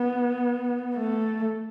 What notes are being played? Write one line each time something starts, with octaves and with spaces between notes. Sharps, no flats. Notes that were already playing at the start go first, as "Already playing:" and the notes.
Already playing: B3
A3